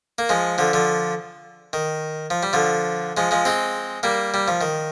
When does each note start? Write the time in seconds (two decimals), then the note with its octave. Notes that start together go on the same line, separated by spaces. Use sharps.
0.18 A#3
0.29 F3 G#3
0.58 D3 F3
0.73 D3 F3
1.73 D#3
2.30 F3
2.43 G3
2.53 D3 F3
3.17 F3 G#3
3.31 F3 G#3
3.45 G#3 C4
4.03 G3 A#3
4.34 G3
4.48 F3
4.61 D#3